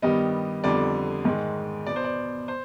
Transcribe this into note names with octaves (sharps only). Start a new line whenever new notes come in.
G2 D#3 G3 B3 D#5
F2 D3 G3 B3 D5
G#2 D#3 G#3
B2 B3 D5
C5
D5
C5